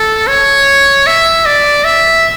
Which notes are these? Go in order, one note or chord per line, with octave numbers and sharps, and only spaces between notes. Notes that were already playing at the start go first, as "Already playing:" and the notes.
Already playing: A4
C#5
E5
D5
E5